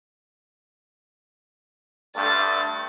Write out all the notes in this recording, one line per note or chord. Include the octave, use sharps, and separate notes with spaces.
G2 D3 A3 A6